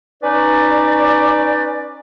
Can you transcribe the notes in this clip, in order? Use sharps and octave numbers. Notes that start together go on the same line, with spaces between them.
C#4 D#4 B4 D5